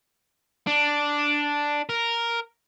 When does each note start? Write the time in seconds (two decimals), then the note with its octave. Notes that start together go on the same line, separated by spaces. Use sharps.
0.67 D4
1.89 A#4